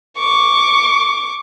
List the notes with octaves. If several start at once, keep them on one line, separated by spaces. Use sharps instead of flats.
C#6 D6